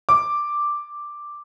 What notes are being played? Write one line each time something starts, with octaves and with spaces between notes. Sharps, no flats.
D6